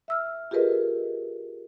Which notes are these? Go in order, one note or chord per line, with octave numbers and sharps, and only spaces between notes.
E5 E6 F6
F4 G4 G#4 A#4 B4 D#5